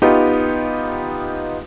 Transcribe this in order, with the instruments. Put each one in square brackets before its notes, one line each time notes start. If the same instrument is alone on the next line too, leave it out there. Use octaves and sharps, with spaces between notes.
[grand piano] B3 D#4 F4 G4